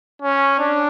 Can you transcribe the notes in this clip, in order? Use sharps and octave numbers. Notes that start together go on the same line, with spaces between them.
C#4
D4